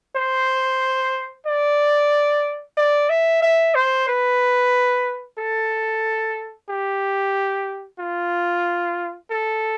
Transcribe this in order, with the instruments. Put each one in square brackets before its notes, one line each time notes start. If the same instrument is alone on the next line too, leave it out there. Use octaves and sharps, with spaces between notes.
[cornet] C5
D5
D5
E5
E5
C5
B4
A4
G4
F4
A4